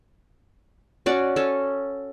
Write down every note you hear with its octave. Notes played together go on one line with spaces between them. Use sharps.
C#4 F#4 D5
C#4 A4